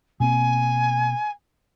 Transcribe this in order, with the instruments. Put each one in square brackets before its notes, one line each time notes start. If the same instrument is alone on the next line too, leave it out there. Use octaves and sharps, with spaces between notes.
[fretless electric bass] B2 A#3 C4 [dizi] G#5